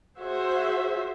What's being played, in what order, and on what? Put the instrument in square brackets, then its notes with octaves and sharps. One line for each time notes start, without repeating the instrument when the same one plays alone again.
[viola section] F#4 G#4 C5 E5